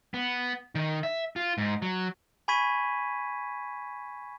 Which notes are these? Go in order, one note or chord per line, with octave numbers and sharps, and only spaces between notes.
B3
D#3
E5
F4
G#2
F#3
G#5 B5 C#6 G#6 B6 D#7